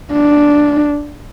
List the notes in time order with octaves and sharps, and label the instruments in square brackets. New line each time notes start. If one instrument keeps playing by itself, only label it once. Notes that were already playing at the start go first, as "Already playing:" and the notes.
[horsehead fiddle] D4